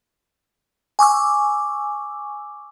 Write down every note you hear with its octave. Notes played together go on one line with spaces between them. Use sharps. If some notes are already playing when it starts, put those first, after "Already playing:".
G#5 C#6 D6 E6